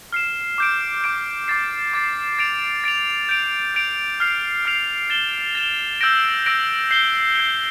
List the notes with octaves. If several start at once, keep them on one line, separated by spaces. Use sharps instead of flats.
F6 C7 E7
D6 G6 D7
D6 G6 D7
D6 A6 C7
D6 A6 C7
A6 D7 F7
A6 D7 F7
G6 D7 F7
G6 D7 F7
F6 C7 F7
F6 C7 F7
A6 E7 G7
A6 E7 G7
E6 G6 A#6 D7
E6 G6 A#6 D7
G6 C7 G7
G6 C7 G7